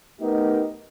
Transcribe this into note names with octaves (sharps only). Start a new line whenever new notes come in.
A3 B3 D#4 G4 A#4